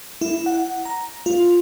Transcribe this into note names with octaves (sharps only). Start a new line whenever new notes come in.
E4
F#5
A#5
F4